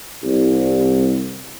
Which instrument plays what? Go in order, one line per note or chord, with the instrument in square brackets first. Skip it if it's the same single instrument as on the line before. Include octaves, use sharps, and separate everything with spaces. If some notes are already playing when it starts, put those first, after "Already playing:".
[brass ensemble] C2